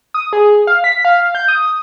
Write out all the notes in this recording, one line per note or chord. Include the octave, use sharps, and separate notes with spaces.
D#6
G#4
F5
B6
F5
G6
D#6